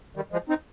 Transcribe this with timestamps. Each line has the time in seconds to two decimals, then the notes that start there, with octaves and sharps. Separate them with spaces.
0.16 D#3 G3
0.32 F3 G#3
0.49 C4 D#4